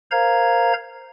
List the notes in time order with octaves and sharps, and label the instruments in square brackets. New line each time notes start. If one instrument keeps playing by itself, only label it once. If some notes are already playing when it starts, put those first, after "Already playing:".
[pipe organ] A#4 C5 F5 A#5 G#6